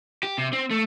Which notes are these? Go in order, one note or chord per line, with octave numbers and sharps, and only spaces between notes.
G4
C3
C4
A3